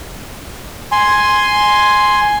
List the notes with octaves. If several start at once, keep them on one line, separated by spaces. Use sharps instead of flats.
G#5 C6